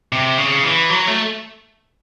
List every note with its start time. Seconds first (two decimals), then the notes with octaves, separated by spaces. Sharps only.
0.12 C3
0.38 C#3
0.64 E3
0.90 F#3
1.07 A3